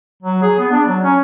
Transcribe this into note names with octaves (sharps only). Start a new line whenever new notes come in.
F#3
G#4
B3
D4
F#3
C#4